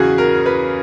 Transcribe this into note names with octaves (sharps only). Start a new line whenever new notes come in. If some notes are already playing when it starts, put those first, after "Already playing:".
Already playing: E2 C#3 F#3 F#4 G#4
A#4
B4